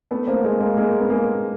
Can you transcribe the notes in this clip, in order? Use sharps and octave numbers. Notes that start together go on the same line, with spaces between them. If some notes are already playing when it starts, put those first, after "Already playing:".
A3 B3
A#3 C4
G#3 A#3
G#3 A#3
G#3 A#3
B3
G#3 A#3